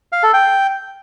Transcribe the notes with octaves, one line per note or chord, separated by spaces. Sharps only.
F5
A4
G5